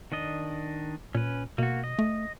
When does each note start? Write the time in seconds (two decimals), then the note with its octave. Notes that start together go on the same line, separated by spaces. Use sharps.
0.12 D#3 D4 D#5
1.15 A#2 C#4 B4
1.58 B2 A#3 F#4
1.84 D#5
1.99 A3